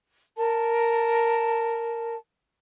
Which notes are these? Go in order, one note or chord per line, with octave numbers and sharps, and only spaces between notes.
A#4 A5